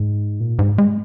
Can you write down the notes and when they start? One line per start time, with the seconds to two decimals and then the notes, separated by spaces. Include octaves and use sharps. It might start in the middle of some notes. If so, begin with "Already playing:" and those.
Already playing: G#2
0.40 A#2
0.59 G#2
0.78 G#3